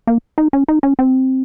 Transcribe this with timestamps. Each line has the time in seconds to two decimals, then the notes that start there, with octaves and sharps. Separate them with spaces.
0.07 A#3
0.38 D#4
0.53 C#4
0.68 D#4
0.83 C#4
0.99 C4